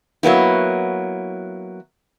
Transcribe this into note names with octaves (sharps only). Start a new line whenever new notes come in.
F#3 A#3 B3 E4